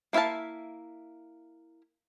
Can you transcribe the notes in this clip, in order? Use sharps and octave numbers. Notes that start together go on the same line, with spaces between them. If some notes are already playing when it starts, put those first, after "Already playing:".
A#3 E4 E5 F5 A5